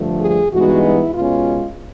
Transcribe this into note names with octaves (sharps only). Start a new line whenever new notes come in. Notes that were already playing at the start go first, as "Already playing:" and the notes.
Already playing: G2 D3 F3 A3
G#4
G2 E3 G#3 B3 D#4 F#4
E4
B2 G#3 C#4 F4